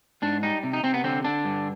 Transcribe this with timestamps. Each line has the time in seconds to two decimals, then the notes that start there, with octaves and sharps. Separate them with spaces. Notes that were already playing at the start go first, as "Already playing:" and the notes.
0.22 G#2 D4
0.43 G3 D#4
0.63 C3
0.73 D#4
0.83 C3 C4
0.94 B3
1.04 D3 C4
1.24 D3 D4
1.45 G2